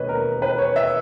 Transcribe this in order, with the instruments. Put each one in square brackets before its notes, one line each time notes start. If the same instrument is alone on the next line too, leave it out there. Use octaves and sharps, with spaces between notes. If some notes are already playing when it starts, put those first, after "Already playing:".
Already playing: [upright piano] E1 D#2 B4 C#5 D#5
A#4
B4
C#5
E5